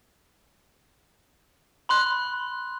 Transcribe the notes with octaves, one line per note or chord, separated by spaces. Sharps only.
B5 C6 F#6